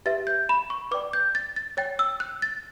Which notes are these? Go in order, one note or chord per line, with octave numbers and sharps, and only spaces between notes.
G4 B4 E5 A6
G6
B5
C#6
B4 D5 G5 D6
G6
A6
A6
C#5 G5 A6
E6
F#6
A6